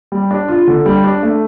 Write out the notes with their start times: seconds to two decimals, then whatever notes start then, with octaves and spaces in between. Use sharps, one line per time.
0.12 G3
0.31 D4
0.48 F4
0.67 D3
0.86 G3
1.04 D4
1.23 A3